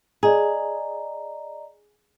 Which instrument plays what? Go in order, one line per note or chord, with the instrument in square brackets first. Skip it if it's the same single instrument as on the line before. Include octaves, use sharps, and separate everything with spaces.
[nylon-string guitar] G#4 [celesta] D5 D#5 A#5